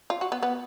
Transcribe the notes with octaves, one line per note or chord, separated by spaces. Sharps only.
F4
F#4
B3
B3